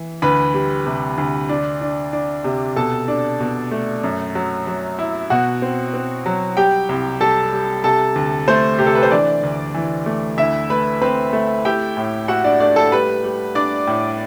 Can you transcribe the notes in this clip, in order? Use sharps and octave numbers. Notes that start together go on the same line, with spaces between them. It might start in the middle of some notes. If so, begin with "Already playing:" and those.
Already playing: E3
D2 B4 B5
G3
C3
D2
D4
D4
D4
C3
B2 A4 A5
D4
B2
A3
F#2
F#3
F#3
E4
B2 F#4 F#5
C4
C4
F#3
G3 G4 G5
C2
G3 A4 A5
G3
C3 A4 A5
D2
A3 C5 C6
C3 G4
A4
B4
C5
E3 D4 D5
D2
E3
A3
D2 E4 E5
A3 B4 B5
C4 B4 B5
A3
E4 G4 G5
A2
E4 F#4 F#5
D4 D5
A3 D4 D5
A4 A5
G3 B4 B5
G3
D4 D5 D6
A2